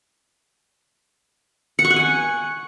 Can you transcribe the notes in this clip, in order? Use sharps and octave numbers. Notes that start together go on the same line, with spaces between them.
F#5
C#6
F#5
G#5